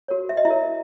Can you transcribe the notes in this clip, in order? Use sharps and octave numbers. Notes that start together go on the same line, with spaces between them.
F#4 A#4 C#5
F#4 E5
D#5
E4 E5
A#4 C#5